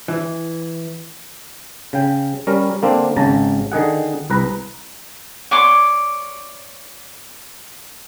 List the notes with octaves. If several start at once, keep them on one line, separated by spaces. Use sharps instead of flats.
E3
C#3 G5
G3 C#4 A#4
D3 A#3 C4 D4
G#1 C#3 A5 A#5
D3 D#3 G#4 F#5
C2 B4 A#5
C#5 D5 C6 D6